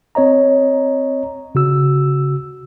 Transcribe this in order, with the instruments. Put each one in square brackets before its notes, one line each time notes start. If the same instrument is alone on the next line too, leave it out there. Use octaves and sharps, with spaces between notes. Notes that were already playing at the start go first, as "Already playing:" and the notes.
[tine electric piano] C4 C#5 D#5 A#5
C#3 F#4 E6